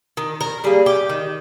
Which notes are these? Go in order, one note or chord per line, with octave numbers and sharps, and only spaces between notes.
D#3
A#4
G3 A#3 G#4
G4
D#3